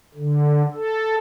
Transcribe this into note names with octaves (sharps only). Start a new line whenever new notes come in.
D3
A4